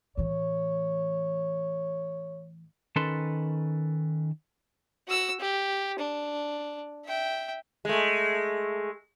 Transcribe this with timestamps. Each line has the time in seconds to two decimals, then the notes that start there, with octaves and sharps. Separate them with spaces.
0.17 A2 E3 C#5
2.96 D#3 C#4 A4 B4 A5 C6
5.08 F#4 E6
5.40 G4
5.99 D4
7.06 E5 G5
7.85 G#3 A3